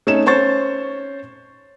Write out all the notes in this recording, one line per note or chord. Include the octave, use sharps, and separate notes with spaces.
A3 C#4 D#4 E7
C#4 C5 C#6 A6